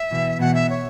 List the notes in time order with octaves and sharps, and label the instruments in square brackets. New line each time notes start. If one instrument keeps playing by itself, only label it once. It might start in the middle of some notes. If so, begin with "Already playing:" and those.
Already playing: [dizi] E5
[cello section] B2 E3
[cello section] B2 E3 [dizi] F#5
[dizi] E5
C#5